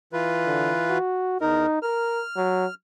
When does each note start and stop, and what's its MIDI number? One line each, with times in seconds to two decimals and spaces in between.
0.13 0.98 52
0.13 0.98 65
0.13 0.98 71
0.46 0.73 50
0.90 1.40 66
1.41 1.66 40
1.41 1.80 63
1.41 1.66 70
1.82 2.21 70
1.82 2.74 89
2.36 2.65 54